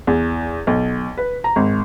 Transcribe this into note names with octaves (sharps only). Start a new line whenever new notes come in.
E2
B1
B4
A#5
G#1